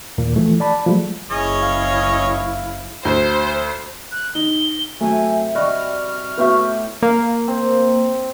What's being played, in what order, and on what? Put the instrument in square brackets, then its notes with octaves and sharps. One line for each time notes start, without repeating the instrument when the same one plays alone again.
[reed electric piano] D#2 A#2 A#3
E3 F3 A3
D5 A5 B5
F3 F#3 G#3 A3
[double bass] F#1 E4 [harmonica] C#4 C#5 D#5 [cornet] G#4
[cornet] F5
[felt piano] D2 [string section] C5
[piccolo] F#6
[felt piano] D#4 [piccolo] G7
[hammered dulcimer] C3 E5 [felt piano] F#3 A3 [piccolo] G#5
[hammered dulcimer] G3 F#4 [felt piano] D5 D#5 [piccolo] F6
[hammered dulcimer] A2 G4 C#6 [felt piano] B3 F#4 E5
[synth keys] A#3
[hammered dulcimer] C4